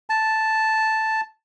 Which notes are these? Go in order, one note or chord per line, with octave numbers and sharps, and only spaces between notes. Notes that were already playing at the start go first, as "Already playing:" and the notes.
A5